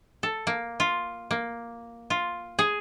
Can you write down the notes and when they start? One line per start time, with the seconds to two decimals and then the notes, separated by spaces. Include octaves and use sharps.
0.23 A4
0.47 A#3
0.80 F4
1.31 A#3
2.10 F4
2.59 G#4